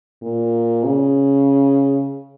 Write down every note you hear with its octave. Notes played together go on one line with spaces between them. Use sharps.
A#2
C#3